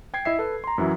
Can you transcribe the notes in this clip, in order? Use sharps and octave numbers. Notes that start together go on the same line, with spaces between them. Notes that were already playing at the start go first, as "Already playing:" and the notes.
G5 G#6 C7
E4 D#5 E5 C7
A4 B4
A#5 C6
F#2 E3 F#3 E4